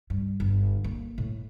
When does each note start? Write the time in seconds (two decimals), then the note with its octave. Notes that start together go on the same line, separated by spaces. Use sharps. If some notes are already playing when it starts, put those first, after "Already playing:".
0.10 G2
0.40 G1
0.84 A#3
1.18 A2